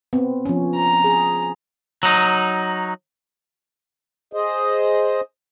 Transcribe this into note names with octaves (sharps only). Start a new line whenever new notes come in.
B3 C4
F3 C#4
A#5
G#4
F#3 D#4
G#4 C5 D#5